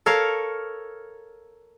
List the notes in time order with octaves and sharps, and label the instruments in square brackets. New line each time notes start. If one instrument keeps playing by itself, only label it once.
[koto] A4 A#4 C#5 F5